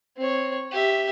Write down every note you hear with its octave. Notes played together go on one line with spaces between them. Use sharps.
C4 C#5
G4 E5